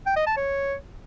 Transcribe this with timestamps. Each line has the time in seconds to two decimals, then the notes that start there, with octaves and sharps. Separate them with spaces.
0.06 G5
0.16 D#5
0.27 A5
0.37 C#5